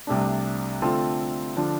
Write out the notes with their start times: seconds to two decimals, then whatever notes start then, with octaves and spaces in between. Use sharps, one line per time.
0.07 C2 C3 A3 D4
0.82 D3 A3 C4 F4 A4
1.57 D3 F3 D4